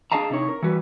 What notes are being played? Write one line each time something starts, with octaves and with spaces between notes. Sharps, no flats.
D4 G#4 D#5 F5 A5 A#5
C3 D#4 E4 C#5
A#4
E3 G3 F#4 B4